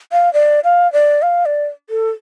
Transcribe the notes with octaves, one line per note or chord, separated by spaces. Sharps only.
F5
D5
F5
D5
F5
D5
A4